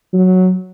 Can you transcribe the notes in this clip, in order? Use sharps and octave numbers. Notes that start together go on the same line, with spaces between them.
F#3